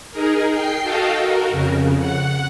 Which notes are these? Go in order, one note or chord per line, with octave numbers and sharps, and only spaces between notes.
D#4 G#4 A#4
G5 C7
F#4 A4 D#5 F5 G5
F#4 A#4
F2 C#3
F#5